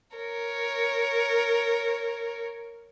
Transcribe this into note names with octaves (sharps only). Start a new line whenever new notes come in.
A#4 C#5